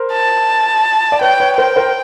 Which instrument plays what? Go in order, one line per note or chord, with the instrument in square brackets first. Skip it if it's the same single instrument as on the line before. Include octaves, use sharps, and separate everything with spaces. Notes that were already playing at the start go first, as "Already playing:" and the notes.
Already playing: [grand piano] A#4 C5
[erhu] A5
[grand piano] D5
[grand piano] B4 C#5 [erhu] G5
[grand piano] B4 C#5
[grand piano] A#4 C5 [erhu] G5
[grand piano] A#4 C5